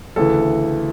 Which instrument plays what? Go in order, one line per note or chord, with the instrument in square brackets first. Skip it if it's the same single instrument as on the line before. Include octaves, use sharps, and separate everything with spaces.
[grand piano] D2 C#3 E3 A4